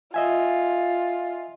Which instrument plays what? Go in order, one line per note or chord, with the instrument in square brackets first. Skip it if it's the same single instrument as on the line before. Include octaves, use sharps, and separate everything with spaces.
[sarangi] F4 [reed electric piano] D#5 E5 G#5